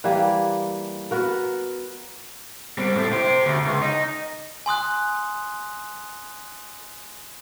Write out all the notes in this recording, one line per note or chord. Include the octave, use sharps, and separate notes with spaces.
E3 G3 A#3
B3 F#4 A#4
G3 C4
A2 A3
G4 C5
D2
C#2
D#4
G#5 C6 D#6 F#6